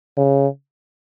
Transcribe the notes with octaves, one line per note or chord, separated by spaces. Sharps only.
C#3